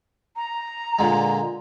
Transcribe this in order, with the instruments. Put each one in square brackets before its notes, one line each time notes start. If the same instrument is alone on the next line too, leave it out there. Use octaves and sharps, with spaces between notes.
[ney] A#5
[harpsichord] A#2 D3 G#3